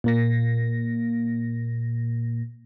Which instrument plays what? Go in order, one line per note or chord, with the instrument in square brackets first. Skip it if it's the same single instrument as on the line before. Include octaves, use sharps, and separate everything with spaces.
[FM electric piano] A#2 A#3 A#6